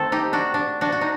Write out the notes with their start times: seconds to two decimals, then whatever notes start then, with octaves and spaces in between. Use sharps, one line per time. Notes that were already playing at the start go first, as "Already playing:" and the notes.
Already playing: D#3 A3 C4 A4
0.12 D#4 G4
0.33 D4 F#4
0.54 D4
0.81 D4 F#4
0.92 F#4
1.01 D#4